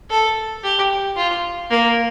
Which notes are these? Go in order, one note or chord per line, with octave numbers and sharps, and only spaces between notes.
A4
G4
F4
A#3